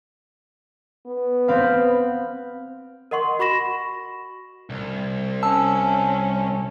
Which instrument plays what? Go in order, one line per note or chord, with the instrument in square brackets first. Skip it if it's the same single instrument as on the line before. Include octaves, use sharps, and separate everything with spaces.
[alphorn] B3
[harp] C4 B4 F5
[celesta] A#4 D#5 F#5 C6 C#6
F#4 B5 C#6 A#6 E7
[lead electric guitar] C2
[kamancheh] C#4 [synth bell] A5 E6